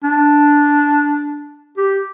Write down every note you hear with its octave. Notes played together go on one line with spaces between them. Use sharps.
D4
G4